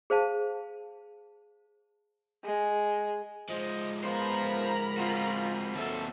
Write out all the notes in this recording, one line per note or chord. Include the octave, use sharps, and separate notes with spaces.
G#4 C5 F5 A5
G#3
F3 G#3 C5 D#5
B3 F4 A#4 C5 A#5 B5
C4 F4 F#4
D#2 F#3 A4 E5